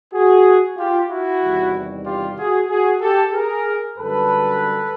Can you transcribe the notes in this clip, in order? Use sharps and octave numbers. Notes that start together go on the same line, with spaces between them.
F#4 G#4
F4 G4
E4 F#4
E2 C3 D#3 G3
F4 G4
F#4 G#4
F#4 G#4
G4 A4
G#4 A#4
F#2 D3 G3 A4 B4